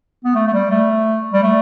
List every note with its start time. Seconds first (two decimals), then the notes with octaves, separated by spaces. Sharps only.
0.25 B3
0.35 A3
0.47 A3
0.53 G3
0.71 A3
1.33 G3
1.43 A3